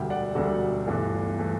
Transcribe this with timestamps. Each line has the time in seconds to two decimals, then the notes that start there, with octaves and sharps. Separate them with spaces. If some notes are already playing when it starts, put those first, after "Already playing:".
Already playing: E1 D2 D3 G3 E5 G5
0.10 D5 F#5
0.35 E1 D2 D3 G3 F#4 A4
0.87 G1 G2 E3 A3
1.39 E3 A3